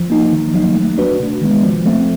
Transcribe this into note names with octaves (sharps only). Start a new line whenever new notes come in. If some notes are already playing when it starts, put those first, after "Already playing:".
Already playing: F3
A#3 D#4
D#3
F#3 A#3 D#4
A3
D4 F#4 B4
C3
D#3 G#3 B3
F3
A3 C4